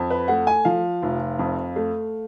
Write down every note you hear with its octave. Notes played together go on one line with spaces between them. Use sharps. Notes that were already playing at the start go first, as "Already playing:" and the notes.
Already playing: F2
B4
A3 F#5
G#5
F3 F5
F1
F2
A3